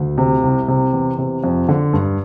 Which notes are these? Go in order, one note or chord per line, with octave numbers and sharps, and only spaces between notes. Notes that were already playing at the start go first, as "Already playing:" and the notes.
Already playing: D2
C3
C2
C3
E2
C3
F2
D3
G2